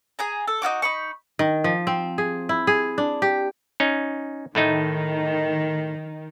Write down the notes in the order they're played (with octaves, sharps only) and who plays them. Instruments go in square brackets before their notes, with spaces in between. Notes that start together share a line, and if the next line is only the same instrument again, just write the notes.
[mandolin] G#4 G#5 A#5
A4
D#4 F4 F#4 D6
D#4 B5 C#6
[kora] D#3
F3
C4
G#4
E4
G#4
D4
G4
[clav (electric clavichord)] C#4 D#4
[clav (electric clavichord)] A2 A3 D#4 [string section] D#3